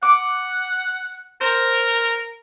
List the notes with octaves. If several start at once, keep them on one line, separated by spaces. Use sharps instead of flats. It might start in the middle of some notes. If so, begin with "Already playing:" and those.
F#5 D6
A#4 C5